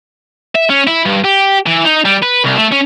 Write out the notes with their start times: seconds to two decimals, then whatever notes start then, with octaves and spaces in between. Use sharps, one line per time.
0.55 E5
0.70 C#4
0.87 E4
1.05 G2
1.24 G4
1.66 E3
1.85 D#4
2.05 G3
2.22 B4
2.44 C2
2.56 A3
2.72 C#4